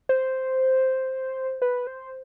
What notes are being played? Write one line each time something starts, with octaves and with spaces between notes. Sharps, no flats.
C5
B4
C5